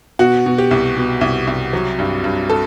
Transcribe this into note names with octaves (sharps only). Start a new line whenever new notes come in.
B2 F#4
B2
G4
C2
B2
C2
C2
F#3
G2
G2
A4